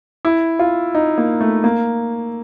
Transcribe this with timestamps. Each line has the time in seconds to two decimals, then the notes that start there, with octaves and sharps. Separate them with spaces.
0.25 E4
0.59 F4
0.95 D#4
1.18 A#3
1.41 A3
1.64 A#3